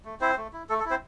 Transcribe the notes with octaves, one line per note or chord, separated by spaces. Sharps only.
A3
C4 E4 C5
A3
E4
A3 A4
A4
E4
C4 C5